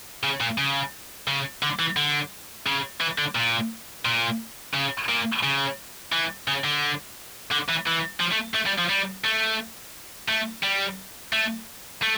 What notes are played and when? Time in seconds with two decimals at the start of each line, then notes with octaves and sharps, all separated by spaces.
0.24 C#3
0.41 A#2
0.58 C#3
1.28 C#3
1.63 D3
1.79 E3
1.97 D3
2.66 C#3
3.01 E3
3.18 D3
3.35 A#2
4.05 A#2
4.74 C#3
5.08 A#2
5.43 C#3
6.12 E3
6.48 C#3
6.64 D3
7.51 D3
7.68 E3
7.86 E3
8.20 F3
8.32 A3
8.55 A3
8.67 G3
8.79 F3
8.90 G3
9.24 A3
10.28 A3
10.63 G3
11.33 A3
12.02 A3